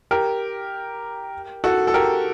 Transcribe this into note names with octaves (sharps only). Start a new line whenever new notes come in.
G4 A#4
F#4 A4
A4
G4 A#4